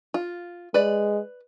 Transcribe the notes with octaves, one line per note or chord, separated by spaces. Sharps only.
F4
G#3 B4 D5